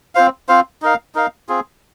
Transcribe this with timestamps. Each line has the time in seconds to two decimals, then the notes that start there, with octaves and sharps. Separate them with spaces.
0.15 C4 F4 C5 F5
0.48 C4 F4 C5 F5
0.82 D#4 A#4 F5
1.15 D#4 A#4 F5
1.49 C4 F4 G#4